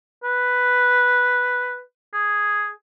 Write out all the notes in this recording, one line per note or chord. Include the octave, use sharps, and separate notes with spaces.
B4
G#4